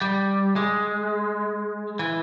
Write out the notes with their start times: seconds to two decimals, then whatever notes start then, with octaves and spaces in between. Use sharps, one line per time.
0.01 G3
0.56 G#3
1.99 E3